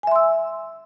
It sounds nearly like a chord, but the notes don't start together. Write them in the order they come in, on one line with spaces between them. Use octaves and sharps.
G#5 E5 C6 E6